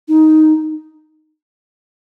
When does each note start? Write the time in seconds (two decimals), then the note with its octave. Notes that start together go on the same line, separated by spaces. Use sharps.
0.08 D#4